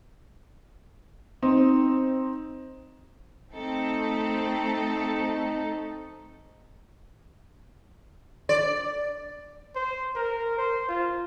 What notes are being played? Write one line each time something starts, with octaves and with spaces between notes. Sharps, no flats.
C4 D#4
A3 C4 D#4 A4
D5
C5
A#4
C5
F4